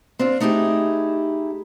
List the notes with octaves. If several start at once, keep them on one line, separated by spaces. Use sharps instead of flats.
C4 D4 F4
A3 D#4 E4 G4 G#4